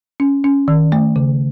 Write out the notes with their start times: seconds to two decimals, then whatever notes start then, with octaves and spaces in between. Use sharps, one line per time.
0.20 C#4
0.44 C#4
0.68 D#3
0.92 A3
1.16 C#3